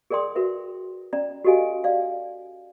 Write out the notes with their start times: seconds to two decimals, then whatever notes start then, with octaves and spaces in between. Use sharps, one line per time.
0.10 G#4 A#4 D5 G5 C6 D#6
0.35 F#4 A#4 B4 E5
1.13 C#4 D5 A#5
1.45 F#4 G4 A4 D#5 F5 G#5
1.84 D5 F5